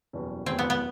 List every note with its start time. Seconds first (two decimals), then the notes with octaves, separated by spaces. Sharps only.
0.13 F#1 E2 B2 G3
0.46 F#1 E2 B2 G3 C4
0.59 B3
0.70 B3